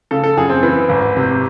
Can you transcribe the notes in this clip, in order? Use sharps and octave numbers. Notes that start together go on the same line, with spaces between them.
C#3 A4
A4
F#2 G#4
C4
E3
G#1
C3